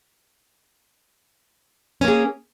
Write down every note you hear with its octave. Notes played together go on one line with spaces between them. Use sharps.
A#3 C#4 G#4